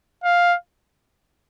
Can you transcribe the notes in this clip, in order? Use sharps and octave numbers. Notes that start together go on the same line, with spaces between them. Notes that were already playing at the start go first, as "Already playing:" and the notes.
F5